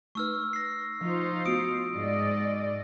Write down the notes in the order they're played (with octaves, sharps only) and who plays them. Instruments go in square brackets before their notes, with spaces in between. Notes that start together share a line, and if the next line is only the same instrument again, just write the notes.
[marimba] A3 D#4 B4 [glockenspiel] C#6 E6 F6
[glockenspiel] A#6 C7
[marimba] F3 [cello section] D#4 F4 C5
[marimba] A3 B3 F#4 [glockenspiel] D#6 C#7 D7
[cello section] G#2 D5 D#5